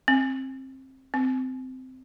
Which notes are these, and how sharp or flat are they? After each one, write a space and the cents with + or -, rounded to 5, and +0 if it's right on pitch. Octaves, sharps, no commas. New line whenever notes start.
C4 +25
C4 -20